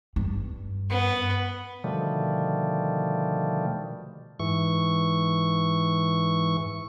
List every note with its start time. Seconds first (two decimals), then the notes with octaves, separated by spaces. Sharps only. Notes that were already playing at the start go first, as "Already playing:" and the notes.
0.16 G2
0.90 B3
1.84 B2 D3 D#3 F3 G3 A3
4.40 G#2 E3 C#6